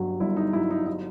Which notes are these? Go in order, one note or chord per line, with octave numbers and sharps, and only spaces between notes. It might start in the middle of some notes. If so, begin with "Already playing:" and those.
Already playing: G1 G2 F#3 F#4 G4
G1 E4
D#4
G2 F#3 E4
D#4
D#4